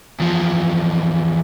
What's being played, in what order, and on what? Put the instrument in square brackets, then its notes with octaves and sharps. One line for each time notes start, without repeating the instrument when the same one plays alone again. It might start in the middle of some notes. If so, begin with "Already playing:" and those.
[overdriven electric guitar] E2 F3